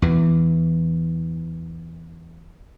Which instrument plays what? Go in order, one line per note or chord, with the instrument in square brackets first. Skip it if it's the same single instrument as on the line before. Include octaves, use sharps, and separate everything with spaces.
[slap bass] E2 E3